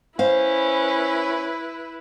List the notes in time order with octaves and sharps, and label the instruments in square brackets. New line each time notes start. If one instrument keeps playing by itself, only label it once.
[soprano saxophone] C#4 [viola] E4 B4 [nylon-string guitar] C5 F5